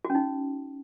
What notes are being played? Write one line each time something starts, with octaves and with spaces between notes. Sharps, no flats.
F#4
C#4
D#4